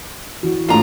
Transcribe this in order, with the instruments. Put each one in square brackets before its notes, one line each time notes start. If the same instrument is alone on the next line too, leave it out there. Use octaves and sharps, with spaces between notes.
[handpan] E3 F#4
[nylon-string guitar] A2 D4 A4 [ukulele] F4 A#5